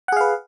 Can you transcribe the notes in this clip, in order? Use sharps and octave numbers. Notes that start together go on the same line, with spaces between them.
G#4 B4 F5 F#5